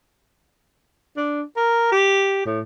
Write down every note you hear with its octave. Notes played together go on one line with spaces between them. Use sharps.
D4
A#4
G4
A2